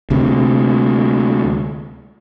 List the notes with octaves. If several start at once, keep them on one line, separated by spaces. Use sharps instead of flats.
D2 C3